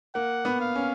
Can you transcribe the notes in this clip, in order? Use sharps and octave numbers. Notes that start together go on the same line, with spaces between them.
A#3 F#5
B3
F5
C#4